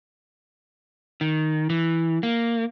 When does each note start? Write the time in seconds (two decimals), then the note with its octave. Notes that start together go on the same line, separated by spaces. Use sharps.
1.21 D#3
1.70 E3
2.23 A#3